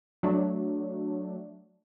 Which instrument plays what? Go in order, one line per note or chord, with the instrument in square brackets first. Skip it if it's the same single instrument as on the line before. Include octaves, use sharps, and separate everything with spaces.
[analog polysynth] F#3 A3 D4